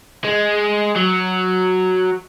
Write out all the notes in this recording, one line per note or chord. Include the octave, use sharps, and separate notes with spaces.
G#3
F#3